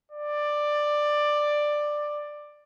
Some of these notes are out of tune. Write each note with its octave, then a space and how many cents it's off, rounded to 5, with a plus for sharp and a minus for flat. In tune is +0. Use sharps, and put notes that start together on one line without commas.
D5 +10